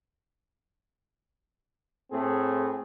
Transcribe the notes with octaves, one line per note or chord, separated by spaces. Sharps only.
A2 A3 C4 G#4